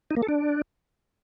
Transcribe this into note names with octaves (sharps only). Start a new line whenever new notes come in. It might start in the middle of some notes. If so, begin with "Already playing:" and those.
D#4
A#3
A4
D4